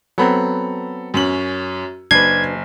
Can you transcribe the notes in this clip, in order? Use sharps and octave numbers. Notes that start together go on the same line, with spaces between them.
F#3 B3 C4 A4 A#5 B5
F#2 C#4 F#7
F#1 D4 B4 G#6 C7